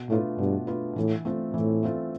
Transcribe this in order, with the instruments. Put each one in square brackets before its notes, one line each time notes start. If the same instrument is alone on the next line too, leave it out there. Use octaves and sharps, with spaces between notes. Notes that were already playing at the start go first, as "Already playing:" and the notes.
Already playing: [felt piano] B2
[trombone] A2 [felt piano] A3 D4 F4 B4
[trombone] G2 [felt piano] B2
[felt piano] A3 D4 F4 B4
[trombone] A2 [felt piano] E3
[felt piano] A3 C4 F4 A4
[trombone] A2 [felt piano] E3
[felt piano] A3 C4 F4 A4